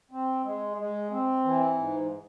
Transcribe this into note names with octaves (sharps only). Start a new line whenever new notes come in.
C4
G#3
G#3
C4
E3
G#2